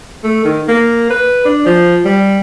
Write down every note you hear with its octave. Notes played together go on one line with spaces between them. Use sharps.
A3
D#3
A#3
B4
D4
F3
G3